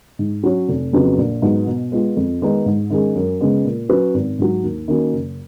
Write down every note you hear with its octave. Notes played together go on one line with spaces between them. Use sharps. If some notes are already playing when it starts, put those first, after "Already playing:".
G#2
F#3 C#4 F#4 C#5
F1
F2 C#3 F#3 B3
A#1
G#2 F#3 B3
B2
G#3 B3 F4
F2
D#3 G#3 B3 D#4
G#2
D#3 G#3 C#4 G#4
F#2
C#3 G#3 B3
A#2
F#3 C#4 F#4 B4
G#1
G#2 F#3
D#2
D#3 A#3 C#4 F#4
F#1